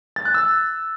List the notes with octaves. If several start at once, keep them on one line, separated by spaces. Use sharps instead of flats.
A6
F#6
E6